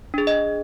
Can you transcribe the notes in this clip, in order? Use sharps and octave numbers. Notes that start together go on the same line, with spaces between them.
D4 G#4
D#5